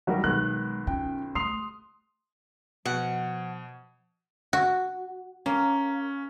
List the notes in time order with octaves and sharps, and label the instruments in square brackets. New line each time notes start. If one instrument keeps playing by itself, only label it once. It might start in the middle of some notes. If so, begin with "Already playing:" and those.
[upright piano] C#2 D#3 G3 [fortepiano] F#3 A#4 [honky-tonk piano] F#4
[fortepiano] B1 D#3 [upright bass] G#3 [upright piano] B3 [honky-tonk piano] F#6
[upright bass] C#4 F4 [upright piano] G5
[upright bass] A3 [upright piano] C6 C7 F7 [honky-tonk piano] D#6
[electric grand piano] B2 [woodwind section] F3 [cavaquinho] F#5
[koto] F#4
[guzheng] A#3 [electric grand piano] C#4